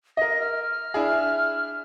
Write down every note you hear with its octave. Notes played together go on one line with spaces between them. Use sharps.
A#4 D#5 A#6
F6
D4 E4 G#4